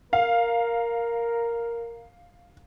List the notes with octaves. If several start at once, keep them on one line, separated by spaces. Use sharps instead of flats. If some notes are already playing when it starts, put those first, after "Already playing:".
A#4 F5